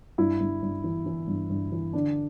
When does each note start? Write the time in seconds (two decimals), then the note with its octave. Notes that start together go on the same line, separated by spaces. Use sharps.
0.18 G2 E4
0.40 G2
0.63 G2
0.84 E3
1.06 E3
1.27 G2
1.50 G2
1.72 E3
1.93 D3 D4